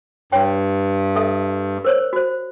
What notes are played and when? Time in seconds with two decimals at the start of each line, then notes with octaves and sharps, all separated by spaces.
0.32 G2 C#5 G5
1.16 A4 E5 A5
1.85 A#4 C5 C#5
2.13 F#4 C5